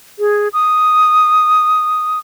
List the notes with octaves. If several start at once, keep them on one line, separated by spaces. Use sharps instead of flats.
G#4
D#6